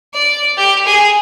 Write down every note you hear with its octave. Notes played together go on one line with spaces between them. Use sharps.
D5
G4
G#4